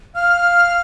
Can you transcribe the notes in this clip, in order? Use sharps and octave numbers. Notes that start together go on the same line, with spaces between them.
F5 F6